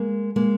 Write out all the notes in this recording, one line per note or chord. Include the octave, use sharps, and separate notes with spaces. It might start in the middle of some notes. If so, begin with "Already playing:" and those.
Already playing: G#3 A#3
G#3 A#3